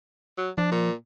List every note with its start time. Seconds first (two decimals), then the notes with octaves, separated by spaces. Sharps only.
0.37 F#3
0.58 F3 D4
0.71 A#2